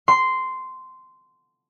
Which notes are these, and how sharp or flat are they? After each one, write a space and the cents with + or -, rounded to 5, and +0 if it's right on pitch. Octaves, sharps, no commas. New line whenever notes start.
C6 -10